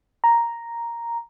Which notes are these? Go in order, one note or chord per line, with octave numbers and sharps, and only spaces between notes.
A#5